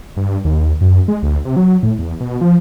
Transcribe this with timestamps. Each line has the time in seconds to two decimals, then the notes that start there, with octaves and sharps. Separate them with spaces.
0.17 G2
0.45 D#2
0.81 F#2
1.08 G#3
1.23 D2
1.45 C3
1.56 F#3
1.83 A2
1.99 E2
2.21 B2
2.41 F3